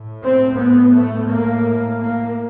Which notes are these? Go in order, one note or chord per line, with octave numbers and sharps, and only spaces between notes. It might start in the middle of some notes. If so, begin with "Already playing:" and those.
Already playing: A2
C4
B3
A3
A#3
A#3